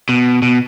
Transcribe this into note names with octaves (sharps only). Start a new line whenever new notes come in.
B2
B2